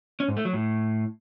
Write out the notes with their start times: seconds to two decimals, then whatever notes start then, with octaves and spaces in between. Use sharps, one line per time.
0.20 C#4
0.28 G#2
0.37 A3
0.45 F#3
0.53 A2